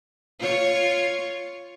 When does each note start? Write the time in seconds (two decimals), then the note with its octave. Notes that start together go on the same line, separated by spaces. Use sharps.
0.40 F4 C#5